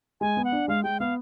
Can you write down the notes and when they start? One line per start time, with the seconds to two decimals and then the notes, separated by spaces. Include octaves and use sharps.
0.21 G#3 G#5
0.37 B3
0.45 F#5
0.52 D4
0.68 G#3 F5
0.84 G#3 G5
1.00 B3 F5